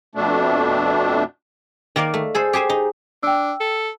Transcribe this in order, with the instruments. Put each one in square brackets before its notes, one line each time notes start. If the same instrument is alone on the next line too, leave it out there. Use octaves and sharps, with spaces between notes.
[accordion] F2 B2 A3 D4
[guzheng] D#3 A#3 A#4 D5 F5
A3
G#4 A4 C5
G4 G#4 C5 G#5
D#4
[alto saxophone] D4 [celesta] G5 E6
[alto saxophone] A4